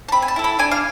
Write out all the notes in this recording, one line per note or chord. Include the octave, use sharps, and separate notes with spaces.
A5
C4 B5
G#5
A5
E4 A4
B5
D4 G#5
F5